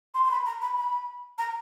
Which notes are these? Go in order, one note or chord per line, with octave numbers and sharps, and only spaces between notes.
C6
C6
B5
A#5
B5
B5
A#5